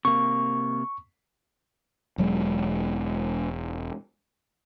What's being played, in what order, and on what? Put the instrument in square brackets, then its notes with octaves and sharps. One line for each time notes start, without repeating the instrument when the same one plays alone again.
[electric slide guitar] C3 A#3 [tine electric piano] C#6
[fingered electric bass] E1 F#3 G#3